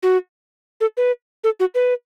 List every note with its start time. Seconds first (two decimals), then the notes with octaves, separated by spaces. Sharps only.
0.03 F#4
0.81 A4
0.97 B4
1.44 A4
1.60 F#4
1.75 B4